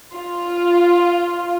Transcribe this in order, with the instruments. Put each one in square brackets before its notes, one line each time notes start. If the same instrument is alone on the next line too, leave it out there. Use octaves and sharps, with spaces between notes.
[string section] F4